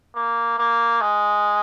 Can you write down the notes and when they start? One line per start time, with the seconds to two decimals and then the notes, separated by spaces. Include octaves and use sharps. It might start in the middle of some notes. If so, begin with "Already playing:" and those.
0.15 A#3
0.58 A#3
1.01 G#3